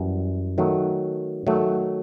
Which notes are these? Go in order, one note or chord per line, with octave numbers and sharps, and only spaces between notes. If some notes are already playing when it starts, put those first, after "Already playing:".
Already playing: F#2 E3 G3
D#3 F#3 A3
D#3 F#3 A3